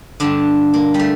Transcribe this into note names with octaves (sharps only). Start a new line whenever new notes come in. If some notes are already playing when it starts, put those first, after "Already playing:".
G2 D3 D4
A#3
G3
A3